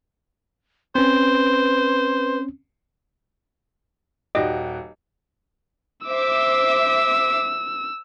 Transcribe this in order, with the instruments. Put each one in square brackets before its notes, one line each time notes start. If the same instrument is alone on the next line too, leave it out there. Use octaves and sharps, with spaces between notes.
[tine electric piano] C4 C#4 [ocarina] B4 [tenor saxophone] C5
[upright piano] D#1 F#4 G5 [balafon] D#4 G4 D5 [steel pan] D#5
[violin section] C5 E5 D6 [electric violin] E6